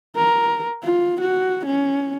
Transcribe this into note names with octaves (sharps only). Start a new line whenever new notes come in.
A#4
F4
F#4
C#4